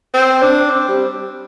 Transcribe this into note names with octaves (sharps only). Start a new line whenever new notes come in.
C4
D4
C4
G3